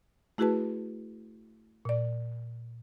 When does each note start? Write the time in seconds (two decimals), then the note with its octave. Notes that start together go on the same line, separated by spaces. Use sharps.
0.38 A3 E4 F#4 G#4 B4 A5
1.85 A#2 D5